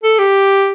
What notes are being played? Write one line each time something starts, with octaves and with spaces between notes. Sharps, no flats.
A4
G4